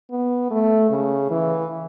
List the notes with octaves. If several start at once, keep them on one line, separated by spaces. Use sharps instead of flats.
B3
A3
C#3
E3